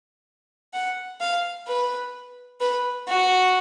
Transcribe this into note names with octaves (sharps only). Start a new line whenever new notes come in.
F#5
F5
B4
B4
F#4